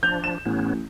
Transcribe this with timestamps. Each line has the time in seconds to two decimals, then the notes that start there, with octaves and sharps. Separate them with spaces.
0.03 F3 D4 G6 F7
0.24 E7
0.46 A1 A2 B3 C#4